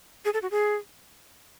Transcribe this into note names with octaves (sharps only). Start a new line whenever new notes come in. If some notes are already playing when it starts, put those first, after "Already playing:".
G#4
A4
F#4
G#4